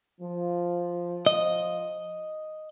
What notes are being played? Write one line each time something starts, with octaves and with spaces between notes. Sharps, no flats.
F3
D#5